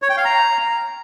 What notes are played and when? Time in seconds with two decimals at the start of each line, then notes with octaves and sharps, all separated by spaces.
0.02 C#5
0.10 G5
0.17 F5
0.25 A#5